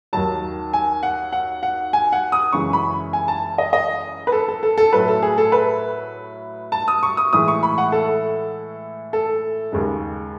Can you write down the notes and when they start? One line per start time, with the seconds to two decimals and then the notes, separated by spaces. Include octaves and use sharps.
0.13 D#2 D#3 F#3 A5
0.73 G#5
1.03 F#5
1.32 F#5
1.63 F#5
1.93 G#5
2.12 F#5
2.32 D#6
2.52 F#2 C#3 E3 G#3 C#6
2.73 B5
3.13 G#5
3.28 A5
3.58 D#5
3.73 D#5
4.27 B4
4.32 A4
4.48 A4
4.63 A4
4.78 A4
4.93 A2 F#3 B4
5.08 A4
5.23 G#4
5.38 A4
5.52 B4
6.72 A5
6.88 D#6
7.03 C#6
7.17 D#6
7.33 A2 E3 G#3 D#6
7.48 C#6
7.63 B5
7.78 F#5
7.92 A4
9.13 A4
9.72 D#2 C#3 G#3